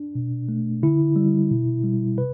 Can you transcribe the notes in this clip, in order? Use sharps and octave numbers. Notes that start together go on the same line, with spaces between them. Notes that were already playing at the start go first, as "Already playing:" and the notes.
Already playing: D4
B2
A3
D3 E4
G3
B2
G3
C3 B4